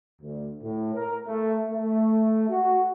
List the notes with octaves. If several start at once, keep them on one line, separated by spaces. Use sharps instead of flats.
D2
A2
A#4
A3
A3
F#4